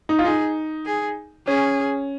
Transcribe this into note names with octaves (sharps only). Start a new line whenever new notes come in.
D#4
F4
D#4 G#4
G#4
C#4 G#4